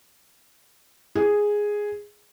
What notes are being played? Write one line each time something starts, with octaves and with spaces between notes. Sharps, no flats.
G#4